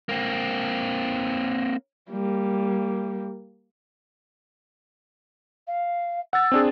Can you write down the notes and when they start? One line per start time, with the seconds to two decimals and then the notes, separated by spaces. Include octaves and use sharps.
0.09 A#3 C4
2.11 G3 A#3
5.67 F5
6.33 F#5 E6 A6
6.52 C4 D4 G#4